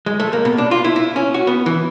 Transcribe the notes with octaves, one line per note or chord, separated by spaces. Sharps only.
G#3
A3
A#3
B2
D4
F4
E4
E4
C#4
F#4
B3
E3